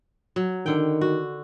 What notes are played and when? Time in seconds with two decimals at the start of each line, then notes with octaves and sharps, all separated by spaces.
0.36 F#3
0.66 D3 D#3 G5
1.01 F#4